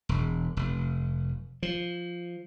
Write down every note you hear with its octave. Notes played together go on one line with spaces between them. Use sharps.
E1
F1
F3